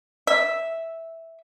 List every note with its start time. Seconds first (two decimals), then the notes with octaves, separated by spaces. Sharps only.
0.27 E5